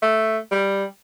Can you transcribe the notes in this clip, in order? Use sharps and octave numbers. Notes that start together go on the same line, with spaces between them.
A3
G3